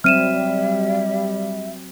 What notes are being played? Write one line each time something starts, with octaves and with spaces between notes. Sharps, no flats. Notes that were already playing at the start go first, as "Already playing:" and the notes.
F#3 G3 C4 E5 F6 D#7 E7